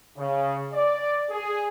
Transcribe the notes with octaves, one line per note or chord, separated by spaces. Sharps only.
C#3
D5
G#4